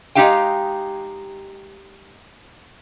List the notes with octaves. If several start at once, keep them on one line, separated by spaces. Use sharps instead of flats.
G#3 C#4 D#4 G4 F5 G5